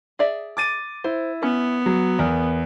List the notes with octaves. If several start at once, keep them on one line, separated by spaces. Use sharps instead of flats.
G#4 D5 E5
D6 A6 D#7
E4 C5
B3 C#4
F#3
E2 A#4